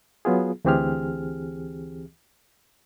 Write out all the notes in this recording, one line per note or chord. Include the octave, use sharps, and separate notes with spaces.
F#3 B3 F4 G#4
D2 E3 C4 G4 G#4 F6